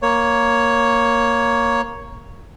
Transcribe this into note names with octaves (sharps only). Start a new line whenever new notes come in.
A#3 C#5